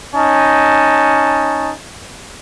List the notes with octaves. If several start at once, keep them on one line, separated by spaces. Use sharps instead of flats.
C#4 D#4 A5